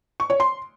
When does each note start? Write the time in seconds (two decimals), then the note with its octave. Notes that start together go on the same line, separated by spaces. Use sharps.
0.20 C#6
0.30 C#5
0.40 C6